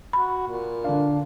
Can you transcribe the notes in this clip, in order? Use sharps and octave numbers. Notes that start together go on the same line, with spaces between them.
F#4 B5
A#2
D3 D4 F5